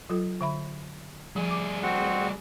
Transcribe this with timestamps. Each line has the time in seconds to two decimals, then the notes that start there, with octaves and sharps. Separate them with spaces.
0.10 F#3 F4 A4
0.41 D3 E5 B5
1.36 F3 G3 G#4
1.51 D6
1.83 C4 F#4 F#5